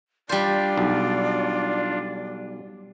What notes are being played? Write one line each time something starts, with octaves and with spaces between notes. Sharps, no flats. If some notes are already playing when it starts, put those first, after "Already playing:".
G3 D4 F4 C5 D5
B1